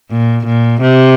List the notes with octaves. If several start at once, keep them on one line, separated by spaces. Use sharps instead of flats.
A#2
A#2
C3